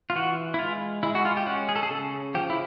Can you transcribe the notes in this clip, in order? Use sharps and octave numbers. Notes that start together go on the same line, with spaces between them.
F4
E3 F#4
E4
G#3 F4
G#3 E4
F#4
F4
G4
C#4 F#4
G#4
A4
G#4
C#3 A4
F3 G4
E4